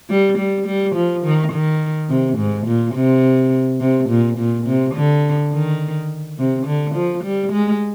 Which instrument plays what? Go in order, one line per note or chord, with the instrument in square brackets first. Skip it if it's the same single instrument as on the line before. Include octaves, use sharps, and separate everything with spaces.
[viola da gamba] G3
G3
G3
F3
D#3
D#3
C3
G#2
A#2
C3
C3
A#2
A#2
C3
D3
D#3
C3
D3
F3
G3
G#3